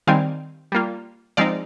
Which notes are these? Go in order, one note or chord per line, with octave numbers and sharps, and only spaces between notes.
D#3 G3 C4 D#4 F5 G#5
G3 A#3 F4
F3 G#3 C4 D#4 D5 F5